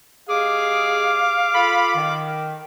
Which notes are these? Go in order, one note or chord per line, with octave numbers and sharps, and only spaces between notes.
G#3 G4 G#4 F5 D6
F4 A4 B5
D#3